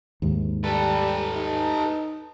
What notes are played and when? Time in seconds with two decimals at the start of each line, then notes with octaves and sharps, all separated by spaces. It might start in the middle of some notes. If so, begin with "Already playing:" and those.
0.22 D#2 G#2
0.64 G3 A4 B4
1.36 D#4